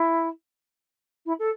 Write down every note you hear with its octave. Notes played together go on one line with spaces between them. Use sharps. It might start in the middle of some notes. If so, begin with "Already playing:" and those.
Already playing: E4
E4
A4